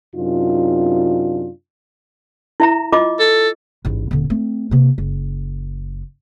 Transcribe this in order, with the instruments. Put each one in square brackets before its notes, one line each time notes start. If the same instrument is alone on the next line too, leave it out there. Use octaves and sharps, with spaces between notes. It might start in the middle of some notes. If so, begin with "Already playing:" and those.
[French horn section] F#2 C3 D4 D#4 F4
[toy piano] E4 E5 A#5
F4 D#5 D6
[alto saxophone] A4
[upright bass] A1 G#2
D#1 D3
A3 C4
C3 A#3
F#1